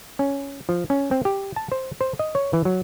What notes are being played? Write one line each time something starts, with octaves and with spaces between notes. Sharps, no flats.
C#4
F3
C#4
C4
G4
A5
C5
C5
D#5
C#5
E3
F#3